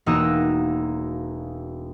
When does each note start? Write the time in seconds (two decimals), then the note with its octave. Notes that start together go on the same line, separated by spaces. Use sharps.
0.06 E1 A#3 D#4 F#4 D#5 E6